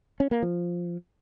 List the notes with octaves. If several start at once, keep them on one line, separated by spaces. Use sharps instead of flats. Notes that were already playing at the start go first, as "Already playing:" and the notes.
C#4
A#3
F3